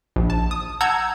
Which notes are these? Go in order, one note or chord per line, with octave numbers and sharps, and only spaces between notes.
A#1
A5
D#6
F#5 A5 A#5 E6 G6 G#6